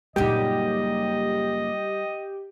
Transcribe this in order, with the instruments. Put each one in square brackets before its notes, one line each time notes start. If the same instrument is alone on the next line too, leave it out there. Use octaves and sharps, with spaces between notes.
[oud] F#2 A#2 C#3 [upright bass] G3 D#4 [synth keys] G4 [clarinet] D#5